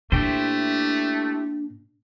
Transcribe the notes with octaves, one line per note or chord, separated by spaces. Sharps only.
A#2 A3 D4 E4 G4 C5